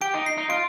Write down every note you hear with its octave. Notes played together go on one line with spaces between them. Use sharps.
G4 D7
D#4
C7
D#4
F4 D7